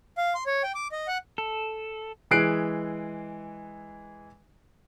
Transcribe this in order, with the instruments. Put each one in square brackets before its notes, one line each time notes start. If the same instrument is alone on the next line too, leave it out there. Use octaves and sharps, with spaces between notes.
[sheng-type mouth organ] F5
C6
C#5
G5
D6
D#5
F#5
[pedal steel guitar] A4
[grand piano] E3 G#3 G#4 F#6 C7 D7